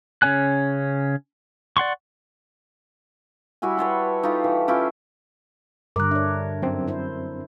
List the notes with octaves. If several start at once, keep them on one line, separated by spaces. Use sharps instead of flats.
C#3 C#4 C#5 G#5 F#6
D5 F#5 C6 C#6
G3 E4 F#4 G#5
B4 C#5 A5 C6
D#4 F4 G4 A4
E3
C#4 E4 F4 G4
G2 D3 G3 A#4 D6 F#6
D4 C#5 E5
F#2 C4 A#4
E4 C5